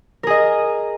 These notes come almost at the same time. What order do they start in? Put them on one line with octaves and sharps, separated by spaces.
A#4 G#4 D#5